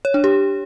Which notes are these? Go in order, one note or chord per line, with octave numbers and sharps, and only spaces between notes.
C#5
D4
G4